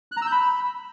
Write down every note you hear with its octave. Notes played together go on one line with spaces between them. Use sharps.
F#6
A#5
E6
G6
B5